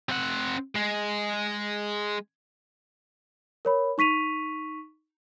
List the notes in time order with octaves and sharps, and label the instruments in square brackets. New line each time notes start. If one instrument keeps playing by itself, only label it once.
[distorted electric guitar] C4 F#5
G#3
[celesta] A#4 C#5 B5
D#4 C#6 B6 D#7 F7